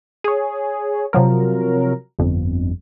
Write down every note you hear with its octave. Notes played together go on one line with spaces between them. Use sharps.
G#4 C#5
C3 F3 F#3 A#4
G1 F2